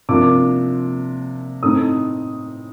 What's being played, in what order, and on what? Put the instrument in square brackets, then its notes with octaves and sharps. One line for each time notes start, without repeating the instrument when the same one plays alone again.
[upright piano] C3 F3 A#3 D4 D6
A2 A3 C4 D#4 D#6